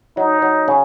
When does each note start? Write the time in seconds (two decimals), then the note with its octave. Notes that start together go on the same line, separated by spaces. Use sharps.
0.17 F#3 D#4
0.42 F#3
0.68 C#3